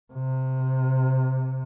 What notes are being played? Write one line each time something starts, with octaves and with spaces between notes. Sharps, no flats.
C3